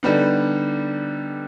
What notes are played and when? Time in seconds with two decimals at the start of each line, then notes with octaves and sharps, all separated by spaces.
0.03 D3 G3 B3 D#4